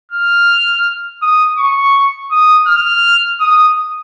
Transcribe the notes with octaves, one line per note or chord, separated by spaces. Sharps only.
F6
D#6
C#6
D#6
F6
D#6